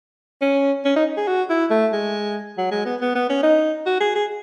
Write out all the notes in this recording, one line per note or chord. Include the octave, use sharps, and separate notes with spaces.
C#4
C#4
D#4
G#4
F#4
E4
A3
G#3
F#3
G#3
B3
B3
B3
C#4
D#4
F#4
G#4
G#4